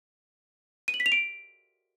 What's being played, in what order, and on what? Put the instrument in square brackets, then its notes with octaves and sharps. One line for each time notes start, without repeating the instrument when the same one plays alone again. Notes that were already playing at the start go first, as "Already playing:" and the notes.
[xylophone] D#7
F#7
B6
F7
D7